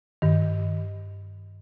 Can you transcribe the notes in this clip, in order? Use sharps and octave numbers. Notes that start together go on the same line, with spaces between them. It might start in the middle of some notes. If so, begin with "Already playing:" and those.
G2 D#3